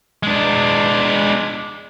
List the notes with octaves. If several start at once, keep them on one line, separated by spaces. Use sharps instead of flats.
G#3 D4